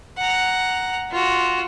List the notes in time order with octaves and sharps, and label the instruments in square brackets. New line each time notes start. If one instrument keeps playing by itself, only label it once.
[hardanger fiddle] F#5 A#5
F4 F#4